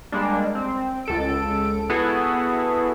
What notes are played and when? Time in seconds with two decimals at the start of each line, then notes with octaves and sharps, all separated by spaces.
0.12 G3 G#3 A#3 D4
0.55 C4
1.05 C#2 A4 D7
1.90 B3 E4 F#4 G#4 A4